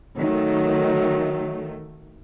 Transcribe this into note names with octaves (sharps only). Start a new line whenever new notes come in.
D#3 F#3 A3